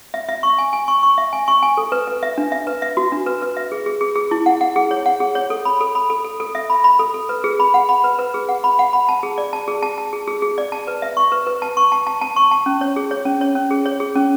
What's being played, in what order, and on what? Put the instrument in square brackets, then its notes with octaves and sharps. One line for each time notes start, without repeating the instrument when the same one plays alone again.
[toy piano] E5
E5
C#6
G#5
G#5
C#6
C#6
E5
G#5
C#6
G#5
A4
B4
B4
E5
D4
E5
B4
E5
F#4
D4
B4
B4
E5
G#4
G#4
G#4
G#4
E4
F#5
F#5
G#4
C#5
F#5
G#4
C#5
A4
B5
A4
B5
A4
A4
A4
E5
B5
B5
A4
A4
B4
G#4
B5
F#5
B5
B4
B4
G#4
F#5
B5
F#5
B5
A5
G#4
D5
A5
G#4
A5
A5
G#4
G#4
G#4
D5
A5
B4
E5
C#6
B4
B4
A5
C#6
A5
A5
A5
C#6
A5
C#4
C#5
G#4
C#5
C#4
C#5
C#4
G#4
C#5
G#4
C#4